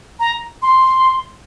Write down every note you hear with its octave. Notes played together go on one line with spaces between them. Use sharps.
A#5
C6